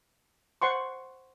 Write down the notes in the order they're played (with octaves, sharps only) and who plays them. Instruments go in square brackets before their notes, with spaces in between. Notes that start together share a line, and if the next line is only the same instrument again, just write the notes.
[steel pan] C5 F#5 C6 C#6